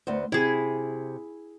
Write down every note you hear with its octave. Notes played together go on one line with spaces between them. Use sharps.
D2 B3 C5
C3 E4 G#4